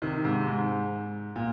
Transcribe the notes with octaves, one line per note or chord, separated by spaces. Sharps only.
C3 D#3
G#2 C3
G#2
A#2